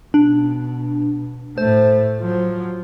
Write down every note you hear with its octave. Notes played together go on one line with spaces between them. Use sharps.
B2 D4
A2 A3 C5
F3 F#3